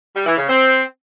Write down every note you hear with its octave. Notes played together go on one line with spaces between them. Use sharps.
G3
E3
C#3
C4